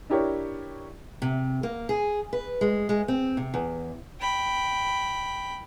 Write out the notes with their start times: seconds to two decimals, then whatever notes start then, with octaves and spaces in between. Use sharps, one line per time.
0.10 D4 E4 G4 A#4 C#5
1.22 C3
1.63 A#3
1.89 G#4
2.33 B4
2.61 G#3
2.89 G#3
3.08 C4
3.37 C3
3.54 E2
4.20 G5 B5